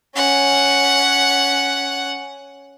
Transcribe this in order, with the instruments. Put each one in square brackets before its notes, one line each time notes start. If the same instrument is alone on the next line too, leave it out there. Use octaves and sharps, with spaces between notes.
[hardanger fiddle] C#4 F#5